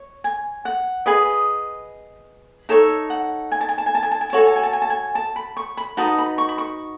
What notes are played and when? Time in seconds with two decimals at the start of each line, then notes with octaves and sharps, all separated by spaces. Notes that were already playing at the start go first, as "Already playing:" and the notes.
Already playing: C#5
0.24 G#5
0.65 F#5
1.06 G#4 B4 D#5
2.69 D#4 A4 C#5 E5
3.10 F#5
3.52 G#5
3.61 A5
3.69 G#5
3.78 A5
3.86 G#5
3.95 A5
4.03 G#5
4.11 A5
4.21 G#5
4.30 A5
4.33 F#4 A4 C#5 G#5
4.47 A5
4.56 G#5
4.63 A5
4.73 G#5
4.82 A5
4.90 G#5
5.15 A5
5.36 B5
5.57 C#6
5.77 B5
5.97 D#4 F#4 B4 D#5 A5
6.18 B5
6.38 C#6
6.49 B5
6.58 C#6